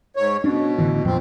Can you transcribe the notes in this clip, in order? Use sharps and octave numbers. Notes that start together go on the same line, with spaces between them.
G#2 C#5
B2 C#4 D4
A1 D3 E3
F2 A#2 F3 C4